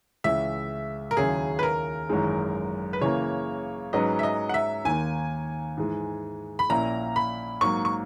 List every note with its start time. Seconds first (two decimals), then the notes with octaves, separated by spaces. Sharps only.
0.24 C#2 C#3 E3 E5
1.11 A#4
1.17 D#2 C#3 F#3 C#4 E4 G#4
1.59 B4
1.63 A#4
2.09 G#1 F#2 E3 G#3 D#4
2.93 B4
3.01 C#3 E3 A#3 C#5
3.93 G#2 F#3 C#4 G#4 B4 D#5
4.19 E5
4.23 D#5
4.49 F#5
4.54 E5
4.85 D#2 D#3 A#3 G#5
5.77 G#2 E3 G#3
6.59 B5
6.69 A#1 A#2 A#3 C#4 E4 A#5
7.16 B5
7.61 G#2 F#3 A#3 C#6
7.85 C#6